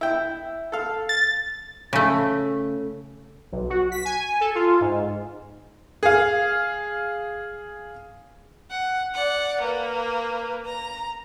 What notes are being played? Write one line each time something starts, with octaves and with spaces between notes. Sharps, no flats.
E4 G5
A4 F5
A6
C#3 A3
B1
F#4
B6
G#5
A4
F4
G#2
G#4 F5
F#5
D5 F#5
A#3 B4
A#5